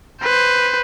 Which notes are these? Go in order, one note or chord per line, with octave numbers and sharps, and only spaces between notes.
B4 C5